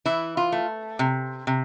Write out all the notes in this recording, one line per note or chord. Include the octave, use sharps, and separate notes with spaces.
E3 E4
F4
A3
C3
C3